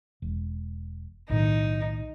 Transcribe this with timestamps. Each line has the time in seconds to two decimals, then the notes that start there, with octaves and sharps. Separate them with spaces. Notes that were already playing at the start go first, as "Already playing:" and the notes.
0.22 E1
1.29 B1 A2 D#3 D#4